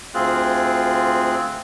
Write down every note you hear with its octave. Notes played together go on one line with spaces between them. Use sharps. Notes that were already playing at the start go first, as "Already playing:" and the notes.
D2 C4 F4 G#4 F#6